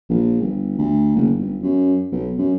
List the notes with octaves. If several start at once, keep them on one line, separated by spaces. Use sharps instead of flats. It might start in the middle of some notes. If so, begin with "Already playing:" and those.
A#1
G1
D2
F#1
G1
F#2
B1
F#2